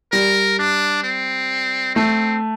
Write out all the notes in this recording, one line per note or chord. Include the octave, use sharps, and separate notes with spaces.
G3 A#4
D4
C4
A3 C4